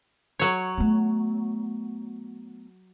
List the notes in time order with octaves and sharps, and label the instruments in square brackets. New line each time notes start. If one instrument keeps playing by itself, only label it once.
[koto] F#3 C#5
[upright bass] A3 B3